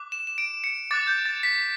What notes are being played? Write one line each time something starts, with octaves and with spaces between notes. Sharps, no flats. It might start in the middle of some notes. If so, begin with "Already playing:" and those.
Already playing: D6 F#6
E7
E7
D7
C#7
D6 F#6 A6
G6
A6
B6